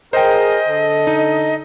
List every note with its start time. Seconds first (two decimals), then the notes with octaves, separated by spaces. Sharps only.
0.13 G#4 A#4 C5 D#5 G5
0.68 D3 A4
1.07 D#4